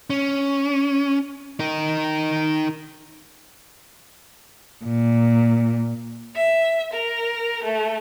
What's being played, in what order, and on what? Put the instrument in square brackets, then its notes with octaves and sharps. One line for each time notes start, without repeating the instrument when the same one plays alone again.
[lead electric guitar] C#4
D#4 A#4
[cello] A#2
[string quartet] E5
A#4
A3